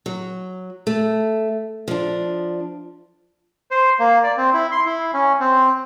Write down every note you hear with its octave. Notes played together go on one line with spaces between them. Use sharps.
F#3
A3
F3 D4
C5
A#3
D5
C4
E4
C6
E4
C#4
C4